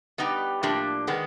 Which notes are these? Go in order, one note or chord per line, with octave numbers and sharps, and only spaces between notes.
G3 B3 D#4 G4
A2 F3 A#3 D4 G4
D#3 G#3 B3